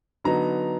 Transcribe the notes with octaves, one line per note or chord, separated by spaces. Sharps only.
D3 F#3 B3 D#4 A#5